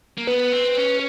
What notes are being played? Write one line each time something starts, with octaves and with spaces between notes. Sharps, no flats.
A#3
B3 B4
C4
C#4